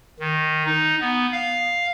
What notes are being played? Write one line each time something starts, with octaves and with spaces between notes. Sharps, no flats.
D#3
D#4
B3
F5